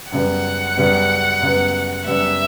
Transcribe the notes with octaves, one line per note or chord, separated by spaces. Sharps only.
F#2 C#3 G3 B3 F#5
F#2 C#3 G3 B3
F#2 C#3 G3 B3
F#2 C#3 G3 B3 E5